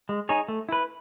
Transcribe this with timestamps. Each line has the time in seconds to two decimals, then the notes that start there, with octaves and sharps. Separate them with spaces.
0.09 G#3
0.29 D#4 G#4 C#5
0.48 A3
0.69 E4 B4